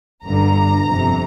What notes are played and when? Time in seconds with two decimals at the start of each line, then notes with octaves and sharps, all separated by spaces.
0.24 G1 G2 D3 A#5
0.85 G1 F2 C3